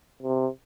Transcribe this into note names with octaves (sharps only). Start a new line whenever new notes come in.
C3